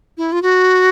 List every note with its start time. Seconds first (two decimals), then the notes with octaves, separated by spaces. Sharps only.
0.17 E4
0.32 F4
0.42 F#4